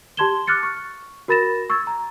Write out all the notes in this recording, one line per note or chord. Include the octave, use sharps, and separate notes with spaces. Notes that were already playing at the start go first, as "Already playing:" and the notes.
G4 A5 C6 G#6 E7 G7
D6 F6 F#6 A6 C#7
C#6
F#4 A#4 B5 A6 A#6 E7
C#6 E6 G#6 A6
A#5